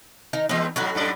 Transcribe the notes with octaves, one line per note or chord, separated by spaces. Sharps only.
D#3 D#4 A#5
E3 G#3 B3 C4 D#4
A2 F#3 C#4 D#4 F#4
F#2 A2 D5